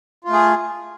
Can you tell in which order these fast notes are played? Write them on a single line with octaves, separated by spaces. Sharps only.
F4 A3 G#4